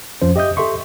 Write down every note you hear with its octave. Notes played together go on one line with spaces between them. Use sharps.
F2 F3 C#4 C5
G4 D#5 E5 D#6 G6
G4 A4 E5 C6 C#6